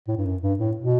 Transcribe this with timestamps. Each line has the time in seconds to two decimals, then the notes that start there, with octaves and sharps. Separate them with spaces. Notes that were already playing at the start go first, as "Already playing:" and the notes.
0.08 A2
0.17 G2
0.25 F#2
0.42 G2
0.59 A2
0.77 B2